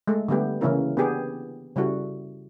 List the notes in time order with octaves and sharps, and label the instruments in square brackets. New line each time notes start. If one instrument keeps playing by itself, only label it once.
[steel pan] G#3 A3 A4
D3 G3 A3 B3 G4
C#3 E3 A#3 C#4 E4 A#4
B3 D4 G4 G#4
C#3 G3 E4 F#4 A4